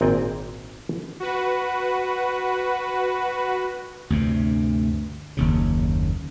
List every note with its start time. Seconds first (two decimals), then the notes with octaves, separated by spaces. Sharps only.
0.01 G#1 A#2 C4 D5 G5 G#5
1.20 F#4 B4
4.10 D2 G2 C3
5.37 F#1 D#2 C#3